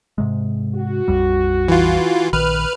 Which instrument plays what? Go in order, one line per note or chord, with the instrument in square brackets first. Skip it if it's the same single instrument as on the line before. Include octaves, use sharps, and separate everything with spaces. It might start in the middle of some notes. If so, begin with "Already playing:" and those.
[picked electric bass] G#2 C3 G#3
[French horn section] F#4
[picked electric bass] A#1 F2 G3
[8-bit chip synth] E3 F4
[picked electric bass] A#1 D#3 [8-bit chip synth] B4 F6